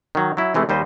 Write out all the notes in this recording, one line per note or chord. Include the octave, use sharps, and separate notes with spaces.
D#3 F#3
F#3 E4
C3 E3 G#3 A3
D#2 G3 C5 D#5